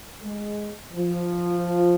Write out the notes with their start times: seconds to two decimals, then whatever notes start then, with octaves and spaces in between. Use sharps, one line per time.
0.21 G#3
0.91 F3